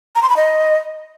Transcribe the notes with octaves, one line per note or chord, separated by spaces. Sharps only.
A#5
C6
B5
D#5